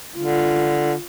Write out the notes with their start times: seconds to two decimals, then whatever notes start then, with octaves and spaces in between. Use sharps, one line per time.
0.18 D3 F4